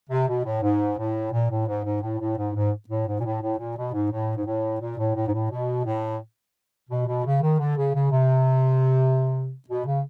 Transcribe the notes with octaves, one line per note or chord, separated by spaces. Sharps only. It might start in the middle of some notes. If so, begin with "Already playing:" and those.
C3
B2
A2
G#2
A2
A#2
A2
G#2
G#2
A2
A2
G#2
G#2
A2
G#2
A#2
A2
A2
A#2
B2
G#2
A2
G#2
A2
A#2
A2
A2
G#2
A2
B2
A2
B2
B2
C#3
D#3
D3
C#3
C#3
C3
B2
C#3